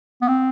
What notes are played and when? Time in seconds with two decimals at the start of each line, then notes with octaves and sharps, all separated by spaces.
0.22 B3
0.28 C4